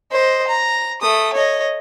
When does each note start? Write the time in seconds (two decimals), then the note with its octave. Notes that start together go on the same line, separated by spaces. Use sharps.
0.12 C5 D#5
0.47 A#5
1.02 A3 D#6
1.33 C#5 D#5